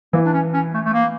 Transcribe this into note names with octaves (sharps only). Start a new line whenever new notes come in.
E3 A#3
D4
C#4
C#4
A3
A3
A#3